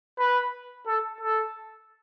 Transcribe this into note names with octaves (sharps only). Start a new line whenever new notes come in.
B4
A4
A4